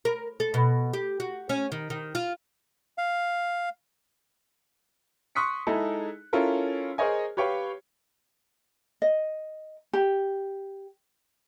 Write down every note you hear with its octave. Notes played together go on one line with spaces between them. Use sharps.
A#4
A4
B2
G4
F#4
C#4
D#3
D#3
F4
F5
C6 C#6 D#6 F#6 B6 C#7
G#3 D#4 E4 G#4 A4
C#4 E4 F4 A4 A#4
G#4 A#4 C5 C#5 D#5 G#5
G4 B4 C#5 F5 G5
D#5
G4